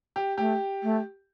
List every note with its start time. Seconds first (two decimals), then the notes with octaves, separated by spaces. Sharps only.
0.16 G4
0.38 A3 G4
0.83 A3